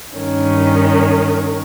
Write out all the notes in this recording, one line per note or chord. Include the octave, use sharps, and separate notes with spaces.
G2 D#3 C#4